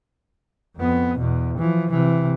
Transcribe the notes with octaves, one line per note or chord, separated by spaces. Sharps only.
F2 B3
E2 B2
E3 F3
C3 E3